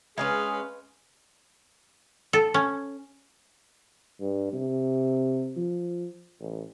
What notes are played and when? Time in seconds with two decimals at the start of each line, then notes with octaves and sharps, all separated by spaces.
0.18 G#3 C4 C#4 G#4 B4 F5
2.33 A4
2.54 C#4
4.21 G2
4.53 C3
5.57 F3
6.40 A1